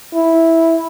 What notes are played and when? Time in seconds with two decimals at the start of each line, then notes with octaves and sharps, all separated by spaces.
0.14 E4